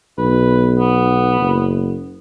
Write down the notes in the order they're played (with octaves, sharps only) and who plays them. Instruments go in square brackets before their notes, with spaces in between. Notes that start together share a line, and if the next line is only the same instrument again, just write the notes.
[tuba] B1 [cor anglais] B4
[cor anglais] B3
[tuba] F#1